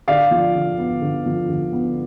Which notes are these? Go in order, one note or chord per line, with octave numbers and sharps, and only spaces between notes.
D3 D5 F5
F3
D3
B3
D3
F3
D3
B3